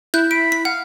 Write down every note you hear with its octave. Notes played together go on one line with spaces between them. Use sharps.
E4 F#6 G6
B5 D7
B6
F5 F#5